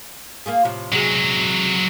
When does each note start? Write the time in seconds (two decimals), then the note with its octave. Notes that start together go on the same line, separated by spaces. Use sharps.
0.46 A#3 F4 G#4
0.65 A2 C3 F3
0.93 C3 F#3 G#3 F#4 G#4